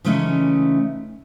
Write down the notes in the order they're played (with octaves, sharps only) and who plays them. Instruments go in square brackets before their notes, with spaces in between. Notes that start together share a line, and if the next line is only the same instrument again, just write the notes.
[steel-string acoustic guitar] C#3 E3 G#3 A3 C#4 D#4